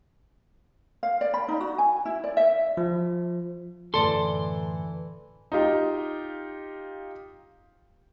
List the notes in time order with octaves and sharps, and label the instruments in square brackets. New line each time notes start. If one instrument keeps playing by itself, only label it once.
[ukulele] F5
D5
B5
D#4
F#4
G#5
E4
D5
E5
[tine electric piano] F3
[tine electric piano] F#2 A2 D3 [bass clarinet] E3 [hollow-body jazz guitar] A4 [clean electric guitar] D5 C6
[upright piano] D#4 F4 G4